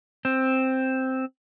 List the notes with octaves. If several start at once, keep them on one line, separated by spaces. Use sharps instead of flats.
C4